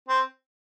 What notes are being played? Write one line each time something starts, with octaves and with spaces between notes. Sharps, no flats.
C4